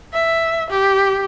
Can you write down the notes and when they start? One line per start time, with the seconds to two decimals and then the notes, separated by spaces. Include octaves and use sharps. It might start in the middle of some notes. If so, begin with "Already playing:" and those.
0.13 E5
0.70 G4